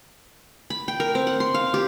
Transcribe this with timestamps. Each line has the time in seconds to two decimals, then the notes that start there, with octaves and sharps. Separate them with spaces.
0.70 B5
0.88 G5
1.00 A#4
1.15 C4
1.27 F#5
1.40 C6
1.54 F5
1.74 G4